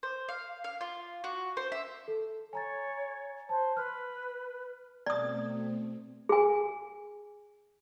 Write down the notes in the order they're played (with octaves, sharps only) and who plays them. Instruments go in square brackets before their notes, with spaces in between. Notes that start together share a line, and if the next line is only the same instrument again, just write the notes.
[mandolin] C5
F5
F5
F4
F#4
C5
E5
[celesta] A4
[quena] C#5 [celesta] G#5 A#5 A6
[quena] C5 [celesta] A5
[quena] B4 [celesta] F6 F#6
[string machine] B2 A3 C4 [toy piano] D5 D#6
[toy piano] G#4 G#5